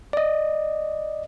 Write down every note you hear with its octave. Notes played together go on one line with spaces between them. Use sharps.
D5 D#5